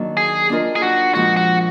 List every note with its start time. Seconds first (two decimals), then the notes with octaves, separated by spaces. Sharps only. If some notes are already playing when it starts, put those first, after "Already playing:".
Already playing: D#3 F#3 A#3 D4 F#4
0.17 G#4
0.49 A#3 D4 F4 A#4 D#5
0.76 G#4
0.82 F#4
1.15 A#2 F3 G#3 F#4
1.36 F#4